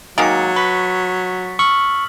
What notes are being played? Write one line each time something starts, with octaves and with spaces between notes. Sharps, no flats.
D#3 F#3 G#3 A#3 A6 C#7
B4 C#6 B6
C#6 E6 F6 F#7